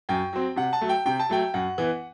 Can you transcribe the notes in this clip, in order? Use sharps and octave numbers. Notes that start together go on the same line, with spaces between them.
F#2 G5
F#3 C4
C3 F#5
A5
F#3 A3
G5
C3 G5
A5
F#3 A3 G5
F#2 F#5
E3 B3